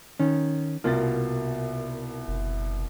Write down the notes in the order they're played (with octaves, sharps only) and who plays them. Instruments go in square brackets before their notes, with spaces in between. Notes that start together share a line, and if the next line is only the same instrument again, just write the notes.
[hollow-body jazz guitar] D#3 C#4
[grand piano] C2 B2 A6 [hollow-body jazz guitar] A#3 F4
[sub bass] F#1